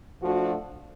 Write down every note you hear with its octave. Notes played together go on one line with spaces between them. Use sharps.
F3 A3 D4 F#4